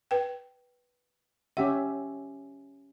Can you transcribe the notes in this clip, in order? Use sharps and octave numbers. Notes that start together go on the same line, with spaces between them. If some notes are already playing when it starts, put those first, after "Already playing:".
B4 G5
C#4 G4 E5 F#5